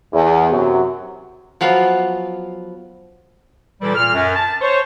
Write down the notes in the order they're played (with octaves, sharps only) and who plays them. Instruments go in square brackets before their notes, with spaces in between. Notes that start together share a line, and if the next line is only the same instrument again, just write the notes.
[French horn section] E2
F#2 C3 F#3
[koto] F3 F#3 B3 F4
[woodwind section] A#2 E3 G3 A4
A#2 F6
F#2
A5
C5 C#5